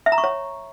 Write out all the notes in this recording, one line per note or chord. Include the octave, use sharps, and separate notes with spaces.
E5
A#5
C#6
C#5